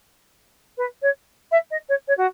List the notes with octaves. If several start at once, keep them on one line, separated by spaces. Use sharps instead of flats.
B4
C#5
E5
D#5
C#5
C#5
F#4